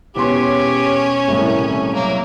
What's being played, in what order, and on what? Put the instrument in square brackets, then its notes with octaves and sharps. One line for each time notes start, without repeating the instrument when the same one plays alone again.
[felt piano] E1 B3 C6 [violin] C#4 C#5 [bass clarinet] G4
[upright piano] C2 A2 [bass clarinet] D#3
[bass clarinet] F#3 [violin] A#3